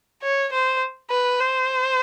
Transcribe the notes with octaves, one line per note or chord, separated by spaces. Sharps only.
C#5
C5
B4
C5